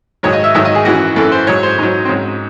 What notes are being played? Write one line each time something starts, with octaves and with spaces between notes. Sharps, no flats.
G#2 D#3 F#3 C#5
D#5
E5
G#2 D#3 F#3 E5
D#5
G#4
F#2 E3 F#4
F#2 E3 A4
C5
G#2 F#3 C#5
C5
G#2 F#3 D#4
C4
G#2 F#3 C#4